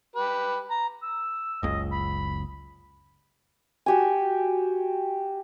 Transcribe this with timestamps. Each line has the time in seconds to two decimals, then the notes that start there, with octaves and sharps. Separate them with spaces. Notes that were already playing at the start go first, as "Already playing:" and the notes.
0.15 G4 B4
0.71 A#5
1.03 E6
1.63 F#1 C#2 D#5
1.92 B5
3.86 F#4 G4 G#5